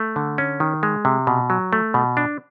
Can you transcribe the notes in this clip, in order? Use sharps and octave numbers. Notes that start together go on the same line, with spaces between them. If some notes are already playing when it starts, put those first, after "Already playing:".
Already playing: A3
D3
C#4
D#3
G#3
C3
B2
F#3
A3
B2
D4